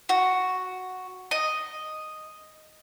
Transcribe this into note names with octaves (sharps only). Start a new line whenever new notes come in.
F#4
D#5